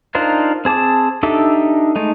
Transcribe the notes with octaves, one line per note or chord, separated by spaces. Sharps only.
D4 D#4 F4 A#4 C5
C4 G#4 A5 D6
D4 D#4 G4 A4 E5
G#3 A3 D#4